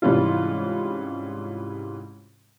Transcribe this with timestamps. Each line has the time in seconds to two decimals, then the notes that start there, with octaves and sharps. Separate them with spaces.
0.02 G#2 C3 E3 G3 C#4 F4